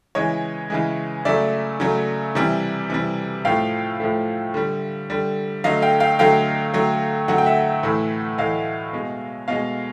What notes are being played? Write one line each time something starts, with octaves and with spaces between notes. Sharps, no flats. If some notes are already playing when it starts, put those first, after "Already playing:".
C#3 E3 G#3 C#5 D#5
C#3 E3 G#3
C#3 F#3 A3 D5 E5
C#3 F#3 A3
C3 E3 G3
C3 E3 G3
A2 F3 A3 F5 G5
A2 F3 A3
D3 G3
D3 G3
D3 F#3 A3 D#5 F5
F5 G5
F5 G5
D3 F#3 A3 F5 G5
D3 F#3 A3
D3 F#3 A3 F#5
G5
E5 F#5
A2 E3 A3
A2 E3 A3 D#5 F5
B2 G#3
B2 G#3 D#5 F5